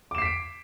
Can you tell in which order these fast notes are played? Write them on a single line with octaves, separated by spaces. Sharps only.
D6 E7 C7 B6 D7